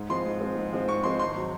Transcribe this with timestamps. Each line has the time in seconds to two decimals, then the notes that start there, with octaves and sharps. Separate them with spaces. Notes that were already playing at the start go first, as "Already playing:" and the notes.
Already playing: G#2
0.09 F3 G#3 C4 C6
0.25 G#2
0.41 F3 G#3 C4
0.57 G#2
0.73 F3 G#3 C4
0.88 G#2 C#6
1.04 F3 G#3 C4 C6
1.20 G#1 C6
1.35 F#3